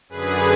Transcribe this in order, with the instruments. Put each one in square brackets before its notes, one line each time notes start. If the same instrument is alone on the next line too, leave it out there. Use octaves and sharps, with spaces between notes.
[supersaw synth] F#2 D3 G#4 B4